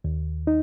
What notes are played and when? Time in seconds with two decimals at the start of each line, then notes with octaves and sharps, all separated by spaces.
0.04 D#2
0.47 D#4